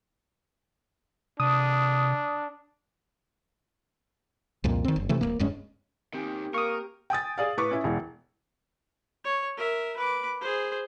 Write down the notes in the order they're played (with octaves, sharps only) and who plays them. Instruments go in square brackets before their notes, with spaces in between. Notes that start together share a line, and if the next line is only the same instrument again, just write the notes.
[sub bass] C3 [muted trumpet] D4 [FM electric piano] D#6
[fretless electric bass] C2 F2 A#2
D#3 C4
F#1
C3 E3 A3
D#1 C#2 A#3
D1 G2 G#3 C#4
[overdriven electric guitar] D#2 D#3 [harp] C4 G4 G#5
[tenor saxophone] A#3 [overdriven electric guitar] A#4 [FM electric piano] C#6 D#6
[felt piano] G5 G#5 D#6 A6
G#4 D5 F5
A2 B4 C#6 D6
C#4 E4
E1 E3
[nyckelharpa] C#5
A#4 E5
B4 D6
G#4 C5